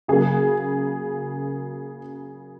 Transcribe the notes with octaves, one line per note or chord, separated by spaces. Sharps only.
C#3 F#3 A#3 G#4